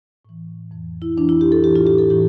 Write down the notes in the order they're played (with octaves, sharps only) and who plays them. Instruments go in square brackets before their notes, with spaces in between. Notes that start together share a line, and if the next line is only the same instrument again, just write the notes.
[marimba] A2 E3
F2 E3
E4
F2 E3 D4
E4
G4
A4
A2 E3 G4
F4
G4
A4
A2 E3 G4